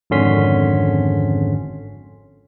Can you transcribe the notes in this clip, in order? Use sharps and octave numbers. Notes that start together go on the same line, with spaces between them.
G#1 F2 D3 C#4 C6 B6